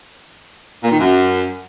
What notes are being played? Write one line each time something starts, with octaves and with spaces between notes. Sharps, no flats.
A#2
D#3
F#2